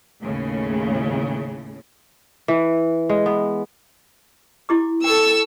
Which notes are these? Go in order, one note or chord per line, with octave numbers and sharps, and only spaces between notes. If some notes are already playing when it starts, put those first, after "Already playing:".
D#2 A2 C#3
E3
G#3
B3
E4 G4 D6
A4 G5 C#6 E6